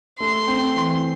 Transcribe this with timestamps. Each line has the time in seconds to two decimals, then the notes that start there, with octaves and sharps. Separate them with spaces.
0.20 A3 C6
0.48 C4
0.76 E3